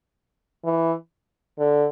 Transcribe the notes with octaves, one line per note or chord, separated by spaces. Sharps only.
E3
D3